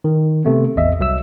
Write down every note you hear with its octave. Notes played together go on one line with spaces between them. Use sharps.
D#3
C3 A3 B3
A1 E2 D#5 E5
C2 F#3 E5 E6